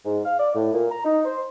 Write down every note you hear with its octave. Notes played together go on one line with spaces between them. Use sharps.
G#2
F5
D5
A2
A#2
A#5
D#4
C5